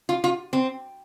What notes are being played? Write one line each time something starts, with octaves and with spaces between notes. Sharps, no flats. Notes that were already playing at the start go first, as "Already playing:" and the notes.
F4
F4
C4